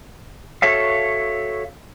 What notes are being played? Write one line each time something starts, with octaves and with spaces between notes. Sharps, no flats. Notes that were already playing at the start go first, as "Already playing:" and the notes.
F#4 A4 C#5 E5 F5